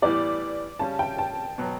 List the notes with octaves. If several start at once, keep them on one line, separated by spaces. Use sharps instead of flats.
A2 E3 G3 B3 D5
C#3 G3 C#4 A5
G5
A5
B2 F#3